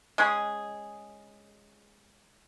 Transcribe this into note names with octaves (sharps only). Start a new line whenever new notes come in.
G#3 C#4 G#4